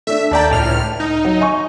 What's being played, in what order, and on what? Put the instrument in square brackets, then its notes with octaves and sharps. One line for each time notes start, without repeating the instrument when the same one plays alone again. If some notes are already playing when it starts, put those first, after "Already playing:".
[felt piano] A3 D4 [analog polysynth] E5
[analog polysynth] D#2 D5 G5 [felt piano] A5 A#5
[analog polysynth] C#2 A2 F6
D#4
[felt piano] F#3
D#5 G#5 C#6